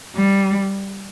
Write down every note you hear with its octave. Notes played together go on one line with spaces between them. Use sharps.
G3